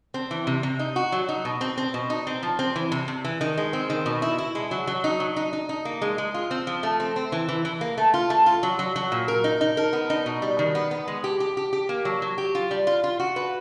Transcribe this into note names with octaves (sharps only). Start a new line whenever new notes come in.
C4
E3
C3
C3
D#4
F#4
F#3
D#4
B2
C4
C4
B2
D#4
C4
F3
C4
E3
C3
C3
E3
D#3
G#3
C4
D#3
B2
E4
E4
G#3
F#3
F#3
D#4
F#3
D#4
D#4
D#4
A#3
G#3
G#3
F4
C4
F3
A3
C4
C4
E3
E3
E3
A#3
A3
F4
A3
F4
F#3
F#3
F#3
A#2
A#4
D#4
D#4
A#4
B3
D#4
B2
G3
D#3
B3
B3
G#3
G4
G4
G4
G4
A#3
F#3
F#3
G4
F4
G3
F4
F4
F#4
B4